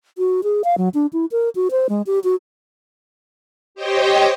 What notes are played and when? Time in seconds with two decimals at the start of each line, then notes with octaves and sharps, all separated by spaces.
0.18 F#4
0.44 G#4
0.64 F5
0.78 F#3
0.94 D4
1.13 E4
1.32 A#4
1.55 F#4
1.71 C5
1.89 G#3
2.07 G4
2.24 F#4
3.75 G4 C5 C#5 D#5 G5